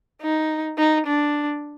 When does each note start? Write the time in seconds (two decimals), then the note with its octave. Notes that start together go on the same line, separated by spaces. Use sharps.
0.22 D#4
0.78 D#4
1.07 D4